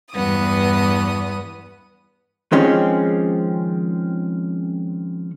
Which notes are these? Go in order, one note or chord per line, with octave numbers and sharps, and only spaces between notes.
E2 G2 B3 D#6
D#3 F3 G#3 C4 C#4 G4